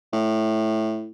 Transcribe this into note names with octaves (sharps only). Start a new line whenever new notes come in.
A2